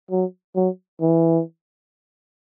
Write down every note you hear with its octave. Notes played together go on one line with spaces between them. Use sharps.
F#3
F#3
E3